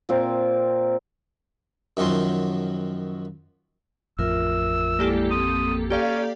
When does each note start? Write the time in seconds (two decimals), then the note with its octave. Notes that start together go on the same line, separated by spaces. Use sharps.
0.09 A#2 C4 A#4
1.97 F#2 D#3 F3 F#3 C6
4.19 A1 F2 F4 A#4 E5 E6
4.99 G#3 A#3 E4 G4 A4 D5
5.31 C4 D#6
5.90 A#3 C#4 G4 A4 D5 F5